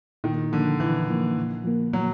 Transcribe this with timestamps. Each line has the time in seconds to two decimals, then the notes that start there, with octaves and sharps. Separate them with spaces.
0.24 A#2 D#3
0.52 D3 F3 A#3
0.80 A#2 E3
1.09 F3 A#3
1.37 A#2
1.65 F3 A#3
1.93 A#2 F#3